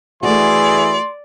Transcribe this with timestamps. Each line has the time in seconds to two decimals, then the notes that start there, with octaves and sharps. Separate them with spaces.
0.23 E3 A3 E4 F#4 G#4 D5 C6